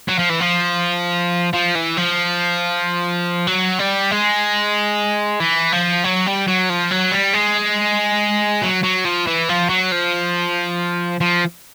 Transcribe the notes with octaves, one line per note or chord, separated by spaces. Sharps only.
F#3
F3
E3
F3
F3
E3
F3
F#3
G3
G#3
E3
F3
F#3
G3
F#3
F3
F#3
G3
G#3
F#3
F#3
F3
E3
F3
F#3
F3
F3